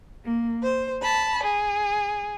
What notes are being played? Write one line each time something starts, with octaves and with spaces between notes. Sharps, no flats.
A#3
C5
A5 B5
G#4